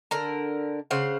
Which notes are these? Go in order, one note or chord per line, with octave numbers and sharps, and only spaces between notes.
D3 A#4 A#5
C#3 C5 F5 F#5